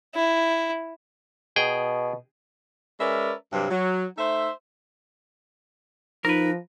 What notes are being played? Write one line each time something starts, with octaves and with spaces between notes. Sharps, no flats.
E4
B2 G#4 G5
G#3 C#4 A#4 B4 D5 E5
G2 C3 F#3
F#3
A3 D#4 C5 E5
F3 D#4 A#4 B4